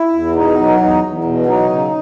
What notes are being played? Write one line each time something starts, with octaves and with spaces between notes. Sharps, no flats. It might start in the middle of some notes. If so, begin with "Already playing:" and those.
Already playing: E4
E2
B2 D#4
F#3
E2 D#4
E2
B2
F#3 D#4
C#3